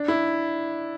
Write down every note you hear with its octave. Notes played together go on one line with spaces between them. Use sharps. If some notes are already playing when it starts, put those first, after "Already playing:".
Already playing: D4
E4